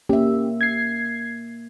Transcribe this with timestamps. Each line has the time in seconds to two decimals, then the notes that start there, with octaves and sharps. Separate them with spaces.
0.09 A#3 C#4 G4 E5
0.61 G#6 C7